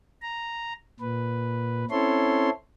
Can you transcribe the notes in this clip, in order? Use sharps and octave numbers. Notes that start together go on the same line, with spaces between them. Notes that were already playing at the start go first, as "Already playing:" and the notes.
A#5
A#2 B4
C4 C#4 E4 A4 C#5 C6